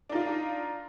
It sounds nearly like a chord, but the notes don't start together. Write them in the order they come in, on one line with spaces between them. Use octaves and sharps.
D4 D#4 F4